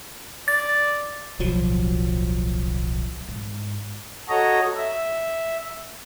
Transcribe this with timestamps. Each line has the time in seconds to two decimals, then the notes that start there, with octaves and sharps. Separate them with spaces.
0.48 D5 A6
1.39 D1 B1 F3 F#3
3.29 G#2
4.29 F#4 A4 C#5 D#5 A#5
4.77 E5